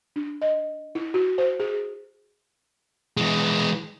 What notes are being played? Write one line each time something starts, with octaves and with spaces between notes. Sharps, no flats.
D4
D#5
E4
F#4
C5
G#4
E3 G#3